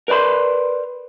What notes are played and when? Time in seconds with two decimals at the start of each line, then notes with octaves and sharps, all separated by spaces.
0.08 A#4 B4 D5 B5 C6